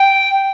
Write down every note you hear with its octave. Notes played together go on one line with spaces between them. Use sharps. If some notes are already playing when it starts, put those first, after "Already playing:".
Already playing: G5